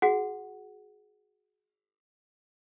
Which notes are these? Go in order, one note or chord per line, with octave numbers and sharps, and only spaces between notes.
F#4 G#4 F#5